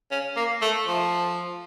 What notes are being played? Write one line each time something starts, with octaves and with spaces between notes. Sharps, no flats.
C#4
A#3
A3
F3